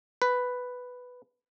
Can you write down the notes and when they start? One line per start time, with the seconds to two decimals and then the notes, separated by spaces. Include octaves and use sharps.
0.22 B4